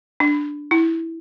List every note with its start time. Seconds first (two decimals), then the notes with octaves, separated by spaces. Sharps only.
0.20 D4
0.71 E4